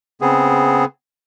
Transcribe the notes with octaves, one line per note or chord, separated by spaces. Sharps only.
C#3 B3 C4 G#4